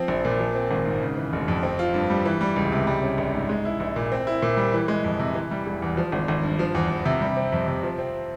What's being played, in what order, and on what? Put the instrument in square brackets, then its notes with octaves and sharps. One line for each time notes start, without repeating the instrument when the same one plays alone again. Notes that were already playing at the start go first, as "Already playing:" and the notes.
Already playing: [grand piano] F3 C4
A#1
A#2
F3
C4
G#1
G#2
C#3
E3
F1
F2
C4
F4
G2
G3
E3
G3
C#2
C3
G3
C#4
A#1
G#2
G#3
E4
A#1
A#2
C4
E4
A#2
G3
E3
G#3
F2
C3
E3
G3
E1
E2
F3
G#1
G#1
G2
F3
E2
E2
C3
G3
C4
F2
C3
F3
C4